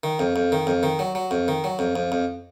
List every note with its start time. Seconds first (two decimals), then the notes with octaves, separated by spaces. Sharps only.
0.03 D#3
0.19 F2
0.36 F2
0.52 D#3
0.67 F2
0.83 D#3
0.99 F#3
1.15 F#3
1.31 F2
1.48 D#3
1.64 F#3
1.79 F2
1.96 F2
2.12 F2